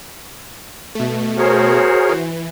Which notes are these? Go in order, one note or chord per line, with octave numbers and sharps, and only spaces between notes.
B2 A3
F#4 G#4 A#4 C5 C#5
E3